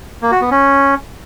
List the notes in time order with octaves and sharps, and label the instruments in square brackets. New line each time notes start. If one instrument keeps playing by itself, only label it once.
[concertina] A#3
F#4
B3
C#4